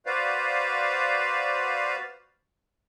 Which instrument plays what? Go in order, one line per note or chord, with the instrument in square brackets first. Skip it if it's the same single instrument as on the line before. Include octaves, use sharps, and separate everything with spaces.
[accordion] F#4 B4 C5 D5 F5